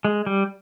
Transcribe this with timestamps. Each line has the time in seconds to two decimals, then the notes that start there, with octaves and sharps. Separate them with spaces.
0.05 G#3
0.26 G3